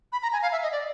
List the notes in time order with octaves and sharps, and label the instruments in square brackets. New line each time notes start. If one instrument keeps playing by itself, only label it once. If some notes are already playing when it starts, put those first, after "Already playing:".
[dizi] B5
A#5
G#5
F5
E5
D#5
D5